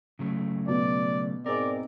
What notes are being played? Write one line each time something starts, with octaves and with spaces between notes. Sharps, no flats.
C#3 F#3 A3
B2 D5
G#2 C4 A#4 D5